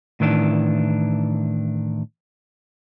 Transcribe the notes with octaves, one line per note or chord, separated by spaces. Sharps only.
A2 D#3 E3 D4